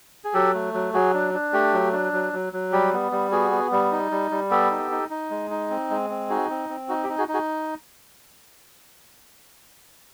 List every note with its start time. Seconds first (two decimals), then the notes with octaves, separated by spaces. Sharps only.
0.24 G#4
0.34 F#3 G4 A4
0.54 A3
0.74 F#3
0.94 F#3 F#4 G#4
1.14 D4
1.34 D4
1.53 A3 G4
1.73 F#3
1.93 D4
2.13 F#3
2.33 F#3
2.53 F#3
2.72 G3 G4
2.93 B3
3.12 G3
3.31 B3 F#4 G#4
3.51 B3
3.72 G3
3.92 D#4
4.11 G3
4.31 G3
4.51 B3 G4 A4
4.71 D#4
4.91 D#4
5.10 D#4
5.30 G#3
5.50 D#4
5.70 C4
5.90 G#3
6.10 C4
6.30 D#4 F#4 G#4
6.49 C4
6.69 C4
6.89 D#4 F#4
7.04 G4
7.09 D#4
7.18 F#4 G#4
7.28 D#4
7.34 F#4 G#4